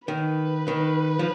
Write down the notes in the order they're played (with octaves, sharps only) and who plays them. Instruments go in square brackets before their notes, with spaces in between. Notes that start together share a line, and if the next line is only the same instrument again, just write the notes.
[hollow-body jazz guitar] D#3 [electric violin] B4
[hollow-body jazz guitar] D#3
F3